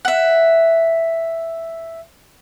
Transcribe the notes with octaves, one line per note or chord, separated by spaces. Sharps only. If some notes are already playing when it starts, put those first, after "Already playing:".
E5 F#5